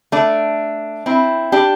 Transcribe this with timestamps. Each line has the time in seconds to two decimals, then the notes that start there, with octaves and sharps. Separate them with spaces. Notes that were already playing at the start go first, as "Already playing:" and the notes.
0.12 A3 D4
1.06 C4 E4
1.52 D4 G4